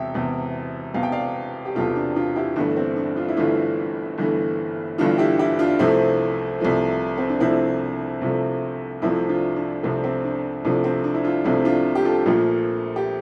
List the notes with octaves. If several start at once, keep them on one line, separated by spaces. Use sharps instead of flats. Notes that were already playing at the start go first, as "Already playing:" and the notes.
Already playing: E1 C3 E5 G5
E1 E2 C3
E1 E2 C3 F5
G5
D5 F5
G4
E1 E2 C3 F4 A4
D4
D4 F4
E4 G4
G1 G2 E3 A3 D4
C4
D4
D4 F4
E4
G1 G2 E3 A3 D4 F4
G1 G2 E3 A3
G1 G2 E3 A3 D4 F4
E4 G4
E4 G4
D4 F4
C2 C3 F3 A3 C4 E4
C2 C3 F3 A3
C4
D4
C2 C3 F3 A3 C4 E4
C2 C3 F3 A3
C2 C3 F3 A3 C4 E4
D4 F4
D4
C2 C3 F3 A3 C4
C4
D4
C2 C3 F3 A3 D4
C4
D4
E4
D4 F4
C2 C3 F3 A3 C4 E4
D4 F4
G4
F4 A4
A#1 A#2 F3 A3
G4